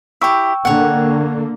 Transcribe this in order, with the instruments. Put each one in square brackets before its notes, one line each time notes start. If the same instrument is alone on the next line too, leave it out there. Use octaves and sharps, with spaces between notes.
[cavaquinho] E4 G4 [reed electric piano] G5 C#6 E6
[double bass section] D3 A#3 [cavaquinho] C#5 F#5